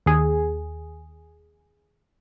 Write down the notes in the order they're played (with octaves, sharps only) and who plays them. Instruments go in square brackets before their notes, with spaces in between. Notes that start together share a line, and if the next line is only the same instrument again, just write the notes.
[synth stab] D#2 G#4